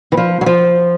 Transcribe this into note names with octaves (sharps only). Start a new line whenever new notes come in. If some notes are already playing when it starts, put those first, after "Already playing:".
E3
F3
F#3
F3